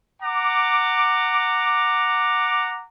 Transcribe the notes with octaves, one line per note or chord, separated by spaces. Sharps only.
F#5 A#5 D6